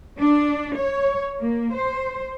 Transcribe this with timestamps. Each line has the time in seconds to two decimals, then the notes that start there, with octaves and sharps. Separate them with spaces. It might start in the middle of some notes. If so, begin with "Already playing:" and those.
0.20 D4
0.79 C#5
1.39 A#3
1.75 C5